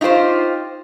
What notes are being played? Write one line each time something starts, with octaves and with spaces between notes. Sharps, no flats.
D#4 F4 G4 B4 C5